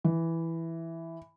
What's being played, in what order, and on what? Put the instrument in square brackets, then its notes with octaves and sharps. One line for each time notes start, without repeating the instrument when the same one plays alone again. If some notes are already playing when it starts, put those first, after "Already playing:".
[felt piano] E3